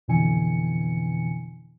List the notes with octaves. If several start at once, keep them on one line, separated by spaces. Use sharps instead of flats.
F2 B2 D3 E3 G#5 C#7